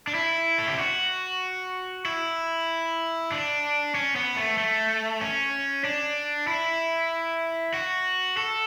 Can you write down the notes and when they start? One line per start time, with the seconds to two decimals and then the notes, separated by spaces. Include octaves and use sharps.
0.07 D4
0.15 E4
0.58 A4
0.68 G4
0.79 F#4
2.05 E4
3.32 D4
3.95 C#4
4.16 B3
4.36 A3
4.58 A3
5.21 C#4
5.84 D4
6.47 E4
7.74 F#4
8.37 A4